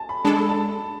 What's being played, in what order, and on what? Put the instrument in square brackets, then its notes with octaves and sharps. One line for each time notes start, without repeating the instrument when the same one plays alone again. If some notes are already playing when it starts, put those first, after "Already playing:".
Already playing: [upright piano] G#5 A5
B5
[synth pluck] G#3 D4 A4 [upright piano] A5
[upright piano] B5
A5